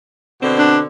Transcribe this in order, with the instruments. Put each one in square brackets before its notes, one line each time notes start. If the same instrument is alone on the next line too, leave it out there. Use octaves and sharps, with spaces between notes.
[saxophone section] B2 D3 C4
[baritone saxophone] D4